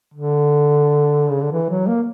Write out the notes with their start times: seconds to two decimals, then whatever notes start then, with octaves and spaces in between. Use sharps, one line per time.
0.14 D3
1.31 C#3
1.42 D3
1.52 E3
1.70 F#3
1.87 A#3